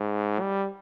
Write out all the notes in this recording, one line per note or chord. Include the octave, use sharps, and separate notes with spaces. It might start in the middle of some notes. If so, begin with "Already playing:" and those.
Already playing: G#2
G3